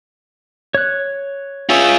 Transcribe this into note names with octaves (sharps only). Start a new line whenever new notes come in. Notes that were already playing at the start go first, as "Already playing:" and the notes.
C#5 F#6
C#4 F4 G#4 E5